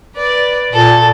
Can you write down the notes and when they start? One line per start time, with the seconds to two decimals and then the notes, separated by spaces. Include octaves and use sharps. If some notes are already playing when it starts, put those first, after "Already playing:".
0.16 B4 D5
0.73 A#2 A4